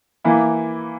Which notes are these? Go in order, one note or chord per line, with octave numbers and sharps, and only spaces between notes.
E3 A#3 E4